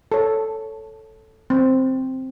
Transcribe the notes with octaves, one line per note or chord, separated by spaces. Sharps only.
A4 C#5
C4